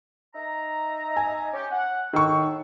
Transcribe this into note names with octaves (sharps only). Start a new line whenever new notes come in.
D#4 E5 A#5
G#5
C#4 G4
F#5
A2 D#3 C#6 E6